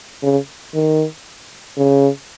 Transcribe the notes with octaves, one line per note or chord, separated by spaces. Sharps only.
C#3
D#3
C#3